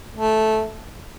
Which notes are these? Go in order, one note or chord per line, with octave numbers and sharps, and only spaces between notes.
A3